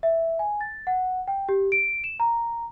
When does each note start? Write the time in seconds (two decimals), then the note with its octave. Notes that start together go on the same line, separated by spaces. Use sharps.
0.03 E5
0.39 G#5
0.61 A6
0.87 F#5
1.28 G5
1.49 G4
1.72 D7
2.04 E7
2.20 A#5